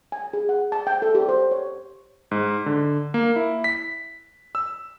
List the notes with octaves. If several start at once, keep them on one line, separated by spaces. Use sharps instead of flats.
G#5
G#4
F#5
A5
G5
A4
G4
C5
C#5
G#2
D3
A#3
E4
B6
E6